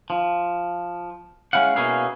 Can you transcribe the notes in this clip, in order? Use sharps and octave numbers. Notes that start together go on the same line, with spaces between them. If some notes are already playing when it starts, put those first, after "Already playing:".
F3
G#3 C#4 E4 F5 F#5
B2 A#3 C#4 E4 G#4 F5